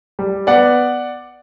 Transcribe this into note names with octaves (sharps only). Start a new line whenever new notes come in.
G3
B3 D5 F#5